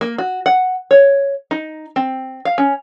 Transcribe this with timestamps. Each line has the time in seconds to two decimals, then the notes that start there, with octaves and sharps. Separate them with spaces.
0.01 A#3
0.18 F#4
0.46 F#5
0.91 C#5
1.51 D#4
1.96 C4
2.45 F5
2.58 C#4